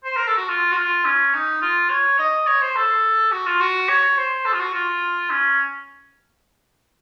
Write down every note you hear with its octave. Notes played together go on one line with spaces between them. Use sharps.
C5
A#4
A4
F#4
F4
F#4
F4
C#4
D#4
F4
C#5
D#5
C#5
C5
A4
F#4
F4
F#4
C#5
C5
A4
F4
F#4
F4
C#4